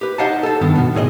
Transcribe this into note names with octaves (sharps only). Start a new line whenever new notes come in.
G4 B4
D#4 C5 D#5 F5 F#5 A5
A4 A5
G2 D#3 B3
B2 B3
C2 A2 G#4 C#5 D#5